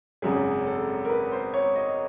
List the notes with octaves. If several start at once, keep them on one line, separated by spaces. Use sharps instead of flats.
G#1 F#2 C#3 G#4
A4
A#4
B4
C5
C#5
D#5